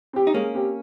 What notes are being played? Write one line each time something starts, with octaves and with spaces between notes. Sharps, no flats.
C4 G4
D#4
G#3 A#3 C#4
C4 G4